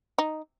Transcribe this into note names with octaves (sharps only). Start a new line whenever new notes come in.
D#4